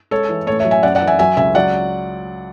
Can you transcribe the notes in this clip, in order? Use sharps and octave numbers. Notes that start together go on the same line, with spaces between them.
G#3 A4 C#5
E3
A2 A4 C#5
C#5 E5
F#3
E5 G#5
F#2 D5 F#5
D5 F#5
E3
E5 G#5
F#3 E5 G#5
C#2 E5 G#5
F#3 D5 F#5